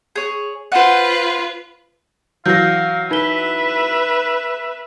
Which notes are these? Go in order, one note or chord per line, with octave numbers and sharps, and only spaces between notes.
G#4 C#5
F4 B4 C5 F#5
E3 F#3 F5 G6 A#6
D#4 B4 E5 G7